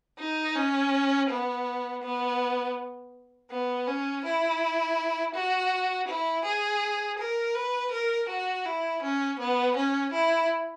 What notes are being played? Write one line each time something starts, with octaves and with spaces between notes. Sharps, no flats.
D#4
C#4
B3
B3
B3
C#4
E4
F#4
E4
G#4
A#4
B4
A#4
F#4
E4
C#4
B3
C#4
E4